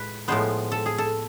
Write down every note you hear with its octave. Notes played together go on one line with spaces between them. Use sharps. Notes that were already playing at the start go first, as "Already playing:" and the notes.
Already playing: A2 G#3 B4
A2 F3 G#3 B3 C5
A4
G#4
A4